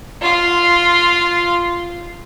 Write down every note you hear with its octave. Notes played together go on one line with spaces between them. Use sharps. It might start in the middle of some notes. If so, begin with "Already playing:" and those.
F4 F5